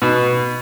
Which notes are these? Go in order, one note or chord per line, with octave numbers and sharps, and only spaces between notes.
B2